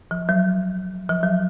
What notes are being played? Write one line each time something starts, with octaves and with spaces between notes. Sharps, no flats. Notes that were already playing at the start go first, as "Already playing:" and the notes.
F3
F#3
F3
F#3